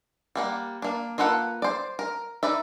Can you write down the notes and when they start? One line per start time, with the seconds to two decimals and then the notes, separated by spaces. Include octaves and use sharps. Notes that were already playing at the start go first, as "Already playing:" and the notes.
0.35 G3 A#3 F#5
0.82 A#3 D4
1.18 A#3 F4 A4 B4 F#5
1.62 C5 D5
1.99 A#4
2.43 D#4 B4 D5 E5